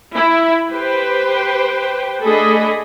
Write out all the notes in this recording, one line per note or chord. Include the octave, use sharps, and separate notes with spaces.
E4
G4 B4 C5 G5
A3 D4 G#4 A4 D#5 B5